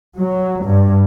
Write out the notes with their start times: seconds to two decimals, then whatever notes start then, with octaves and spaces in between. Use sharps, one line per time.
0.19 F#3
0.65 G2